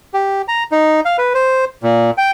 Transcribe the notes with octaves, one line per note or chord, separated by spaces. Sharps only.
G4
A#5
D#4
F5
B4
C5
A#2
G5